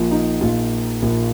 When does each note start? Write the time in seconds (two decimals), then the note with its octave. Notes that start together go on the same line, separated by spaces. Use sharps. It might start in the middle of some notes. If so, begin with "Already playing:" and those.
Already playing: A#1 A#2 F3
0.11 D#4
0.41 A#1 A#2 F3 F4
1.02 A#1 A#2 F3